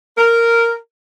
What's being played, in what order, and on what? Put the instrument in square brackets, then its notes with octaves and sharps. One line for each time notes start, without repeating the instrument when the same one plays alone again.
[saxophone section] A#4